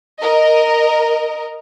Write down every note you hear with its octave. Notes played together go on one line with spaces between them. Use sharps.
A#4 D#5